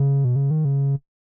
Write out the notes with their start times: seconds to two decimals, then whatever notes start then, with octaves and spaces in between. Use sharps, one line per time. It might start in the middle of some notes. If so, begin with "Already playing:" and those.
Already playing: C#3
0.25 B2
0.36 C#3
0.51 D#3
0.65 C#3